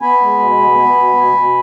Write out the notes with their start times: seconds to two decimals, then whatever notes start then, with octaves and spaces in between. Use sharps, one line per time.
0.01 B3 G#5 B5
0.21 G#3
0.40 B2
0.59 B3
0.78 B3
0.97 B2
1.17 B2
1.36 B2